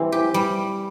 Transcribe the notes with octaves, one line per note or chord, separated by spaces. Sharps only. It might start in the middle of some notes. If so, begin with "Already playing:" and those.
Already playing: E3 G3 C4
G4
G3